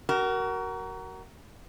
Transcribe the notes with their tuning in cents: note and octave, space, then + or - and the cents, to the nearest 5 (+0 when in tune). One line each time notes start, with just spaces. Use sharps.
F#4 +30 A#4 +0